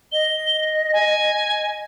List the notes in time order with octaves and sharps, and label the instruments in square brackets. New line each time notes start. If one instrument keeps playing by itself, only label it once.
[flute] D#5 [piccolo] G7
[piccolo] G#5